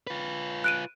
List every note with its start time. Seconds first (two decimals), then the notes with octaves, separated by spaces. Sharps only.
0.07 F4 B4
0.64 F#6 D7 D#7